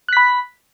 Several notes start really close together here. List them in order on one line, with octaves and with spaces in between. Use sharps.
F#6 B6 B5